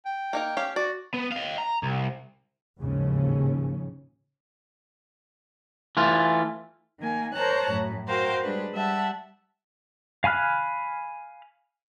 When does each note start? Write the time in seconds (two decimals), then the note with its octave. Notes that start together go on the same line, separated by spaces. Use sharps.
0.05 G5
0.33 A#3 D#4 A#4
0.57 C#4 G4 F5
0.76 F#4 D5
1.14 B3
1.32 D#5 F5
1.58 A#5
1.83 C2
2.79 A1 D#2 G#2 C#3 F3 C#4
5.97 E3 A3 F4
6.99 D#3 A#3 G#5
7.33 A#4 C5 C#5 A5 A#5 F#6
7.69 F#2 A2
8.07 F#4 A#4 C5 F5 G5
8.42 G3 G#3 D4 B4
8.73 G3 E5 F#5 A5
10.24 F5 G#5 B5 F6 F#6